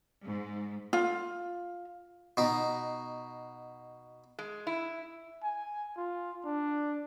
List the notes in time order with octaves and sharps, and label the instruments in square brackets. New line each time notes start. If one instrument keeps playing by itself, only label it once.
[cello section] G#2
[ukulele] F4
[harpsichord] B2 D#4
[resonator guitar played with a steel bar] G#3
E4
[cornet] G#5
F4
D4